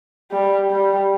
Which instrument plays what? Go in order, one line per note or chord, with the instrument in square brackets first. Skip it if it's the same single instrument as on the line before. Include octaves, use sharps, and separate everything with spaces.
[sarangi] G3
G3